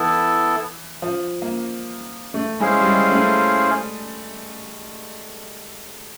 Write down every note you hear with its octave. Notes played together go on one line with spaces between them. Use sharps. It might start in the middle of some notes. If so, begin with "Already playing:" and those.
Already playing: E3 B3 E4 A4
F3
A#3
A3
G#3 C#4 E4 G#4 C5 F5
G3
G#3
A3